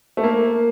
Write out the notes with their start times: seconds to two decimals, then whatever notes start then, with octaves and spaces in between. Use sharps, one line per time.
0.17 A3
0.23 A#3